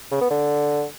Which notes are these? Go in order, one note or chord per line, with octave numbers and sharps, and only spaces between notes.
C#3
B3
D3